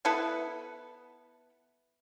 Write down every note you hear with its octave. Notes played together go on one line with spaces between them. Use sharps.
B3 E4 A4 B4